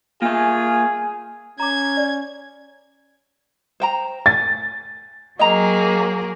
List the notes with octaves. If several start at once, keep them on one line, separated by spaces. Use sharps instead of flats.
A#3 F4 G#4 E5 G#5
C#4 A#5 D6 G#6
D5
C5 G5 A#5
G#5 A6
F#3 A#3 G#4 D#5 G5 A#5